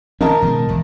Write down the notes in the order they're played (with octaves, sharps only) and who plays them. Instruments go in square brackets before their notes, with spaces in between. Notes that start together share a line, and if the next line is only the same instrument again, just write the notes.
[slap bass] D#3 C4 C#4 [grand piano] A#4 D#5 A5
[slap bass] B2 D#3 G#3
G#1 E2